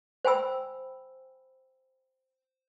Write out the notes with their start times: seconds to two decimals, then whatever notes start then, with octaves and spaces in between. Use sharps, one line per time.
0.25 C5 G5 G#5 B5 E6